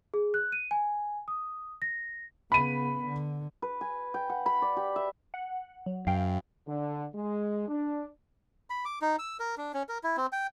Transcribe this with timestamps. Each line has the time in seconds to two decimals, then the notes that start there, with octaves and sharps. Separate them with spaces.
0.14 G#4
0.34 F#6
0.52 D#7
0.71 G#5
1.28 D#6
1.82 A#6
2.52 C#3 B3 B5 D#7
3.06 D3
3.62 B4
3.81 G#5
4.14 G5
4.30 F#5
4.46 B5
4.62 D5
4.77 G4
4.96 E5
5.34 F#5
5.86 F#3
6.07 F#2 F5 G5
6.67 D3
7.14 G#3
7.68 D4
8.70 B5
8.85 D6
9.02 D#4
9.19 E6
9.40 A#4
9.58 D4
9.74 C#4
9.89 A#4
10.04 E4
10.17 C4
10.33 G5